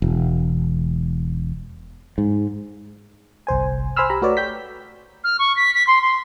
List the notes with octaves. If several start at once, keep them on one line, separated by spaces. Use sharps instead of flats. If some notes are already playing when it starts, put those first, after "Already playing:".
E1
G#2
G1 C2 C5 G#5
C5 G#5 B5 C6 E6 F6
G4 A#5 B5
A3 F#4 B4 C#5 D5
G5 G6 B6
F6
C#6
B6
B6
C6
C6